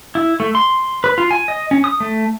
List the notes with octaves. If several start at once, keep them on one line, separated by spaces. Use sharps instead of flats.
E4
A3
C6
B4
F4
G#5
D#5
C#4
D#6
A3